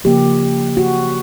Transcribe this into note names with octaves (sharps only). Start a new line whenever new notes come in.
C#3 F3 A#3 G4
F#4